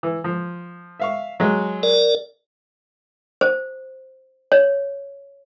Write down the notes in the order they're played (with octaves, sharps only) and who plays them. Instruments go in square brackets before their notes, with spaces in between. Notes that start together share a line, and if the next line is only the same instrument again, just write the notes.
[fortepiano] E3
F3
E5 F5 C#6
F#3 G#3
[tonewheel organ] A#4 D5
[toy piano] C5
C#5